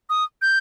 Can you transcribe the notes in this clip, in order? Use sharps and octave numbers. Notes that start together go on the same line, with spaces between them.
D#6
G6